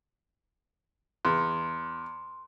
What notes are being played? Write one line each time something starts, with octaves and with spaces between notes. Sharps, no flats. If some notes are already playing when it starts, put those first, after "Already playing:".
E2 C6